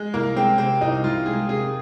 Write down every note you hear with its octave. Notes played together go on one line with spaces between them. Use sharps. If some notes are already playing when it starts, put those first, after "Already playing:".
Already playing: G#3
C2 A#3
G#3 C4
C3 C4
C2 D#4
C2 F4
G#3 G#4
C3 G#4